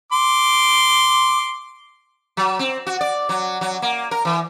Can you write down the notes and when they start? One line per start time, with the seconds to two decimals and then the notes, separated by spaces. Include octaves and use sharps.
0.12 C6 D6
2.37 F#3
2.59 C4
2.87 F#4
3.01 D5
3.29 F#3
3.61 F#3
3.82 A#3
4.11 A#4
4.25 E3